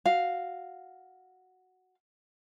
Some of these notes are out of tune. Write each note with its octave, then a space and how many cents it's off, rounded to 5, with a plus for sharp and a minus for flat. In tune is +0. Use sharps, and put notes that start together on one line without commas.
F#4 +0 F5 +0